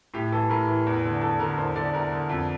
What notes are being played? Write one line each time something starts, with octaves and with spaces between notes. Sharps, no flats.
A2 G4
E3 A4
A2 A#4
E3
E2
D3
E2 A4
D3 A#4
E2 C5
D3 D5
E2 A#4
D3
F2